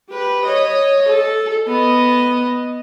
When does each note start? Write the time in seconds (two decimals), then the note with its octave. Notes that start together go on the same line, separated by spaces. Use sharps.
0.10 G4 B4
0.46 C#5 D#5
1.09 A4
1.68 B3 D#5